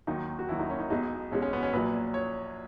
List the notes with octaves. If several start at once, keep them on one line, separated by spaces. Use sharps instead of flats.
D#2 D#3 F#3 D#4
F#4
D#2 D#3 F#3 E4
D#4
C#4
D#4
B1 B2 G#3 D#4
B1 B2 G#3 C#4
C#4
B3
C#4
A#1 A#2 F#3 B4
C#5